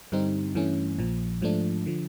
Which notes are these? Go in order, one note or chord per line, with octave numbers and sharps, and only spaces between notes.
G2 D3 G3 C4 D#4
G2 E3 A3 C#4
A#1 A#2 F3
G#2 F3 A3 D4
D3 F3